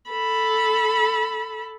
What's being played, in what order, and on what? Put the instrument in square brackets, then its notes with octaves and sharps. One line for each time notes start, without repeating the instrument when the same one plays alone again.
[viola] A4 B5